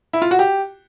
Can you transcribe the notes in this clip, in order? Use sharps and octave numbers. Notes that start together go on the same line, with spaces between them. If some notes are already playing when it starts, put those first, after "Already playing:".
E4
F4
F#4
G4